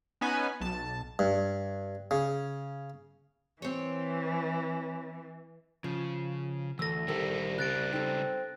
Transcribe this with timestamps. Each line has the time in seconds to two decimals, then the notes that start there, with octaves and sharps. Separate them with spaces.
0.21 B3 C#4 D#4 B4 G#5
0.61 B1 A5
1.19 G2
2.11 C#3
3.62 E3 C4 C#5
5.84 C#3 F3
6.79 D2 E3 A4 E6 A#6
7.08 C2 D#3 G3 A4 A#4 G5
7.59 C#3 G3 G4 F#6 A6 D7
7.93 C4 D#4 A4